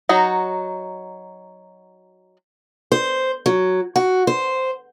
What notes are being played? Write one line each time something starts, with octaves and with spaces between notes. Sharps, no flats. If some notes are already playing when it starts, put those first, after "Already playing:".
F#3 D#4 F#4
C5
F#3
F#4
C5